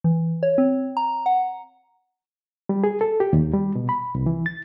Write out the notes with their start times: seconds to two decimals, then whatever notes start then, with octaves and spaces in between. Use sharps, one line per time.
0.04 E3
0.43 C#5
0.58 C4
0.97 A#5
1.26 F#5
2.69 G3
2.84 G#4
3.01 A4
3.20 G4
3.33 D#2
3.53 G3
3.75 B2
3.89 B5
4.15 C2
4.26 E3
4.46 A6